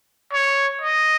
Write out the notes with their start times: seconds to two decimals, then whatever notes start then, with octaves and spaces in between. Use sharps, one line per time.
0.33 C#5
0.82 D#5